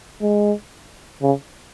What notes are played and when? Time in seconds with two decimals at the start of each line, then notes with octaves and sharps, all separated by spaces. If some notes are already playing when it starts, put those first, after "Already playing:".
0.22 G#3
1.22 C#3